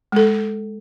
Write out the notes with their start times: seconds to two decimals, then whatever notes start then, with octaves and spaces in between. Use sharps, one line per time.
0.12 G#3 A4